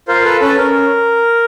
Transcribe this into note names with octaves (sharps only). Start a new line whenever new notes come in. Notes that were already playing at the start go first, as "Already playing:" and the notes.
F4 A#4 C5
A4 B4
C#4 A4 B4
C#4 A#4